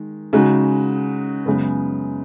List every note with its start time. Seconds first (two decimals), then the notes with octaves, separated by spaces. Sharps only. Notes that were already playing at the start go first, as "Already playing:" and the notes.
Already playing: D#3 G#3
0.33 C#3 G#3 D#4 F#4
1.46 F#2 C#3 G#3 B3